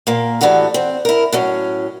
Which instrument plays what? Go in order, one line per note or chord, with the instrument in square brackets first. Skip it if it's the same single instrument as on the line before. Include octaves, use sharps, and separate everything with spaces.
[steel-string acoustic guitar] A#2 A#3
A2 E3 G3 F#4 A4
C4
E4 A#4
A2 F#3 C#4